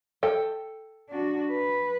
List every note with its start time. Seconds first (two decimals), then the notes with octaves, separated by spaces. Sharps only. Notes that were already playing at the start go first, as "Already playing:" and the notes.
0.23 A4 G5
1.09 D4 F#4
1.50 B4